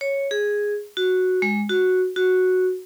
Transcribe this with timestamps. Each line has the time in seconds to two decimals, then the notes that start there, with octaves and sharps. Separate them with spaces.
0.01 C#5
0.31 G#4
0.97 F#4
1.42 G#3
1.70 F#4
2.16 F#4